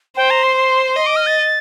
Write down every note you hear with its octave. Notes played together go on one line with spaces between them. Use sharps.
C5 G5
A#5
C6
C6
D#5 C6
D6
F6
A6